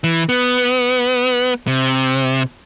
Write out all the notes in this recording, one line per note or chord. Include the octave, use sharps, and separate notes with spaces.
E3
B3
C3